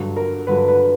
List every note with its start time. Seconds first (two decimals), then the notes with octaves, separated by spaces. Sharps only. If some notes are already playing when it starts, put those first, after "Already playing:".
Already playing: G2 D3 F#3
0.16 A#4
0.47 G2 D3 F#3 B4
0.68 B4